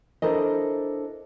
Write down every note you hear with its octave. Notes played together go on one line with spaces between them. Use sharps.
D4 E4 A4 A#4 C5 D#5